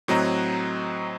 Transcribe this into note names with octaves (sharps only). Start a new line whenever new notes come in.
A2 F#3 C4 D#5 A#5 F#6